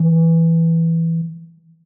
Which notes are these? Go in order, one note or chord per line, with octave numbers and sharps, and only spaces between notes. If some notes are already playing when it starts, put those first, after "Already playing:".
Already playing: E3